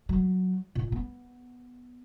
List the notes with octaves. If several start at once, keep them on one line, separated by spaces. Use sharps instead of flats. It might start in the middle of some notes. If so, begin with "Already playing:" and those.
F#3
A#2
B3